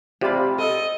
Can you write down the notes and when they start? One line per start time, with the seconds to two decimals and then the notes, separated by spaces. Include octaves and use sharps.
0.21 C3 F4 G4 D5 B5
0.59 A4 D#5